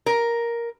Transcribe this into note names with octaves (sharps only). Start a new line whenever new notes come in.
A#4